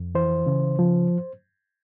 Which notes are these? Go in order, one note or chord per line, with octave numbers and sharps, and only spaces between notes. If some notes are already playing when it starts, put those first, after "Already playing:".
Already playing: F2
E3 C5
C#3
F3